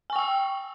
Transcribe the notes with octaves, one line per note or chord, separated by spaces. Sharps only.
G5 G#5 C#6 E6